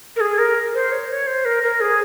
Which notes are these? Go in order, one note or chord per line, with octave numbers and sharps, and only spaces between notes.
A#4
G#4
A#4
C5
C#5
C#5
C5
A#4
A#4
G#4